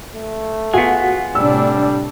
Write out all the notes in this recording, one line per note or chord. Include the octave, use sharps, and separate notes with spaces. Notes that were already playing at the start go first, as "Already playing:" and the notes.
A3
B3 F4 F#4 G#4
A2 C3 G3 D4 E6